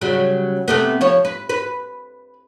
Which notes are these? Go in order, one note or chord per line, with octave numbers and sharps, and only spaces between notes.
C#3 F#3 G3
C3 A3 B3
F3 C#5
B4
B4